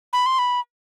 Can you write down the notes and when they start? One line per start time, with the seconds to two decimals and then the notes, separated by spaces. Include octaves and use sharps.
0.13 B5
0.26 C6
0.39 B5